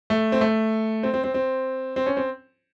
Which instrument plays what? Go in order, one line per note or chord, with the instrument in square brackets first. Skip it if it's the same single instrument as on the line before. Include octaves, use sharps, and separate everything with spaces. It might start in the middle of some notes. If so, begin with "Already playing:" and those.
[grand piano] A3
C4
A3
C4
C4
C4
C4
C4
C#4
C4